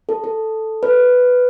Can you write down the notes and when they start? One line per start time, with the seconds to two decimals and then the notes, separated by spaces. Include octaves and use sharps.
0.09 A4
0.24 A4
0.83 B4